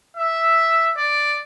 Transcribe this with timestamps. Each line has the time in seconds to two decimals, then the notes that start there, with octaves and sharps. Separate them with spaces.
0.17 E5
0.97 D5